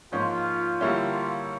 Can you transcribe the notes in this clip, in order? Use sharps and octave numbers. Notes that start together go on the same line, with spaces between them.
G#2 F3 A#3 C#4 F4
D3 G3 A#3 C#4 E4